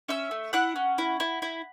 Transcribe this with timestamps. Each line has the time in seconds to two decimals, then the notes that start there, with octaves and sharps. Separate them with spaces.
0.08 C#4 E5 E6
0.31 A3
0.53 E4 F#5 F#6
0.76 C#4
0.98 E4
1.20 E4
1.42 E4